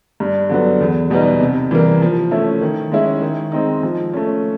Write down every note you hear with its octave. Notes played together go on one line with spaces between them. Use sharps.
G2
D3 F#3 B3
E2
B2 G3 B3 D#4
C3
E3 G3 A#3
F3
A3 C#4 E4
D#3
G#3 C#4 E4
D#3
G#3 C4 D#4
F3
A3 C#4